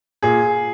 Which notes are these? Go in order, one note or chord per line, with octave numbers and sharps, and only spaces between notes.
A#2 G#4